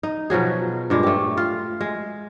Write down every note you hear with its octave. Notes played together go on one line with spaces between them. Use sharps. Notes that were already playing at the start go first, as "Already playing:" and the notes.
D#4
B2 F3 F#3 G#4
G2 A#2 G#3
A3 G4
F4
G#3